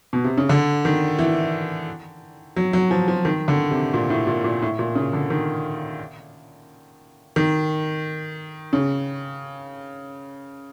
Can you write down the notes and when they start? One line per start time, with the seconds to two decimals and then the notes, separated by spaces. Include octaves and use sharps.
0.13 B2
0.24 C3
0.38 C#3
0.49 D3
0.85 D#3
1.19 E3
2.56 F#3
2.73 F#3
2.91 F3
3.08 F3
3.25 D#3
3.48 D3
3.71 C3
3.94 A#2
4.10 A2
4.27 A#2
4.44 A#2
4.62 A2
4.79 A#2
4.95 C#3
5.13 D3
5.30 D#3
7.36 D#3
8.73 C#3